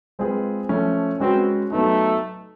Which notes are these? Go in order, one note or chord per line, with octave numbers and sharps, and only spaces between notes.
G#3 C4 F4 G#4 B4
F3 A3 C#4
G#3 C4 C#4 F#4 B4
F#3 A3 B3 D#4